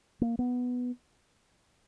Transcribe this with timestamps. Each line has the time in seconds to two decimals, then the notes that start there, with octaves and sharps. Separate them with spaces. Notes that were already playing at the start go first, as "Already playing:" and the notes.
0.21 A#3
0.39 B3